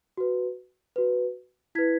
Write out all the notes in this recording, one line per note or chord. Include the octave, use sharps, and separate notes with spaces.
F#4 B4
F#4 B4
E4 B4 G#6 B6